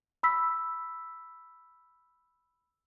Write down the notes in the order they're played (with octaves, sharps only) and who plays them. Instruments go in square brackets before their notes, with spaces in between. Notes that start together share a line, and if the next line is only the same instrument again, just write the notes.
[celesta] B5 E6 B6